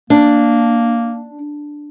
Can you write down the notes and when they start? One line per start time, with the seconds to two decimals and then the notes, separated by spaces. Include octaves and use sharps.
0.10 A#3 D4